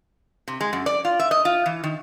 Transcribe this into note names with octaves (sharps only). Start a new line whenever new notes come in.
C3
G#3
F#2
D5
F4
E5
D#5
F4
E3
D#3